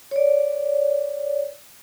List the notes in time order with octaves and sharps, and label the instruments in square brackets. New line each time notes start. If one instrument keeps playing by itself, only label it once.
[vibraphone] C#5 D5